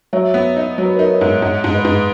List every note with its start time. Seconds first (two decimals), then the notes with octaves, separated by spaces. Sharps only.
0.13 F#3 C#5 E5
0.34 B3
0.56 D#4
0.78 F#3 C#5
0.85 B4
0.94 A#4 C#5
0.99 D#4
1.10 C#5 E5
1.21 G#2
1.42 G#2 D#5 F#5
1.64 G#2
1.74 B4 D#5
1.85 G#2